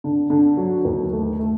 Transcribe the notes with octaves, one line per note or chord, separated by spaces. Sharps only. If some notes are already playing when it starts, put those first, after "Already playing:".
D3
D3
F#3
D#2
A3
A3